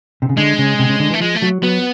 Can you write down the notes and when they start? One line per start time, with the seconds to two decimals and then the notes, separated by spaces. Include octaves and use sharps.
0.22 C3
0.29 C#3
0.37 D3 G#3
0.58 C#3
0.79 C3
0.89 C#3
1.00 D3
1.10 E3
1.14 A3
1.20 F3 G#3
1.36 A3
1.43 F#3
1.63 F#3 B3